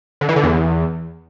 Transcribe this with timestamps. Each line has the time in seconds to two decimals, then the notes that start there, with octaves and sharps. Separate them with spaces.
0.21 D3
0.29 E3
0.36 D3
0.43 E2